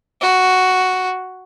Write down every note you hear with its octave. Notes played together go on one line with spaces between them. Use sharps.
F#4